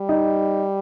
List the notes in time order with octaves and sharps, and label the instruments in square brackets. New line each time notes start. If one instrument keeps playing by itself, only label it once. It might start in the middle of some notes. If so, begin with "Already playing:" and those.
Already playing: [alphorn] G3
[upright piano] D#4